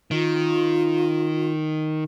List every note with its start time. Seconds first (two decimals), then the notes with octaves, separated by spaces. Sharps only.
0.11 D#3 F4